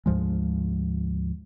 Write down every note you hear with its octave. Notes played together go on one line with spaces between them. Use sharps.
D2 G#2 F3 G#3